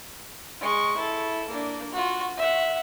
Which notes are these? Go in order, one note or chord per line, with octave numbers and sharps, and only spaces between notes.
G#3 C#6
E4 A4
A#3 D4
F4 F#4
E5 F#5